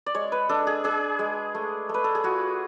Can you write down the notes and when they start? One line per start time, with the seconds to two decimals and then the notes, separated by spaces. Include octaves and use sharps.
0.06 D5
0.15 G#3 C#5
0.32 B4
0.49 D4 A4
0.67 G#4
0.84 D4 G#4
1.19 G#3
1.55 A3
1.89 A3
1.94 B4
2.04 A4
2.15 G#4
2.24 F4 F#4